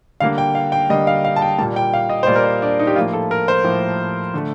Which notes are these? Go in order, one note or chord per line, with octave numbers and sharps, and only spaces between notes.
D3 G3 A#3 F5
G5
F5
G5
D3 G3 A#3 D#5
F5
F5
A5
G5
A#2 G3 A#3 A5
G5
F5
D#5
C5
A#2 G3 A#3 D5
A#4
C5
D4
D#4
G4
A2 F3 A#3 F4
A4
A#4
C5
A2 F3 A#3
D3 A3